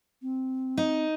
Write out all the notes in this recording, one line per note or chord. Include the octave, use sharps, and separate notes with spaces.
C4
D#4